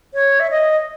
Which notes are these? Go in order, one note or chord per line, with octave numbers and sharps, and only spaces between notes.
C#5
E5
D#5